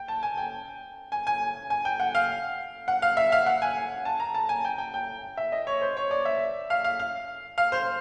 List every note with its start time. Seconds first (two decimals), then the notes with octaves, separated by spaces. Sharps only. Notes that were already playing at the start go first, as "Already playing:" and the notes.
Already playing: G5
0.08 A5
0.23 G#5
0.37 G5
1.12 G#5
1.27 G#5
1.70 G#5
1.85 G5
2.00 F#5
2.15 F5
2.88 F#5
3.02 F5
3.17 E5
3.32 F5
3.46 F#5
3.62 G#5
4.05 A5
4.20 A#5
4.34 A5
4.49 G#5
4.65 G5
4.78 G5
4.94 G5
5.37 E5
5.52 D#5
5.67 C#5
5.81 C5
5.97 C#5
6.11 D5
6.25 E5
6.70 F5
6.84 F5
7.00 F5
7.58 F5
7.72 C5